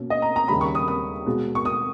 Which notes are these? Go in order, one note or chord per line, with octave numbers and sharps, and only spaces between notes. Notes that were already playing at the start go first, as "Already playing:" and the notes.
Already playing: B2 A#3 C#4
D#5
A#5
A#5
D#2 C#3 G3 B5
C#6
D#6
D#6
B2 G#3 B3
C#6
D#6